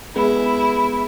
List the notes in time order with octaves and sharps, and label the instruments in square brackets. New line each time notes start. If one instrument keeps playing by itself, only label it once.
[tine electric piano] G#3 B3 B4 [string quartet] E4 [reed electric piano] G#4